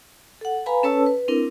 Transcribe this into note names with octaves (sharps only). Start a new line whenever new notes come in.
A4 F#5
B4 F5 G#5 A#5 B5
C#4 A4 B4 C#5 A5 E6
B4
C4 D4 E4 A#4